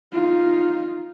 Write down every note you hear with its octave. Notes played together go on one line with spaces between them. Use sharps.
D#4 F4